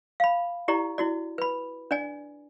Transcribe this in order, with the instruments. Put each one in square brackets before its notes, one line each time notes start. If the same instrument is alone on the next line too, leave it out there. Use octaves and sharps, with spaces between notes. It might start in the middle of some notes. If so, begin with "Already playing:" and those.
[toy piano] F5 B5
E4 G4 D5 A#5
E4 F#4 D5
B4 B5
D4 D5 G#5